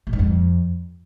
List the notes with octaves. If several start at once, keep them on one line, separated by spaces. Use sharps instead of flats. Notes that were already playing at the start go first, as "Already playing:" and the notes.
A#2
G#2
F2